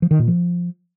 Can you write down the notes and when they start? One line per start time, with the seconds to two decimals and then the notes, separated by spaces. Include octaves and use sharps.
0.02 F3
0.11 D#3
0.19 A#2
0.28 F3